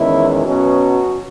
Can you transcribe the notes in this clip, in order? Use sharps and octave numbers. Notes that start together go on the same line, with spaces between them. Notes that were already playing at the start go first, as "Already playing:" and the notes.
Already playing: E2 D#3 G#3 C#4 E4
B2 F#3 C#4 F#4